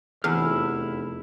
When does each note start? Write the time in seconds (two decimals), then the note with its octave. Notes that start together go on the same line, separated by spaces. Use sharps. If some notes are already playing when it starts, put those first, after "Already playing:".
0.24 F1 E2 E4 G#4 E6 F6